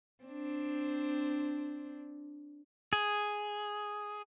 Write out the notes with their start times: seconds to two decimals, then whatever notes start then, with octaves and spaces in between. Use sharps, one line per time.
0.24 C4 D4
2.93 G#4